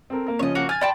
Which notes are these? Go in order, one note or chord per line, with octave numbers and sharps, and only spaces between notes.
C4 A4 A#4
A#3 A#4
C#3 F3 C#4 C#5 D#5
A#3 F#4
G#5 F6 A6
D5 G5 A5 B5 C6